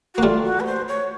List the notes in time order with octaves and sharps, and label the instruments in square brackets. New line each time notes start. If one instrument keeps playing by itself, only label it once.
[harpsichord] A#3 [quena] F#4
[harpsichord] G3 A3 [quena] F4
[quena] F#4
B4
C5
C#5